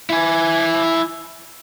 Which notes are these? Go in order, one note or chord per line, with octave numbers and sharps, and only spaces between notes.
E4 G#5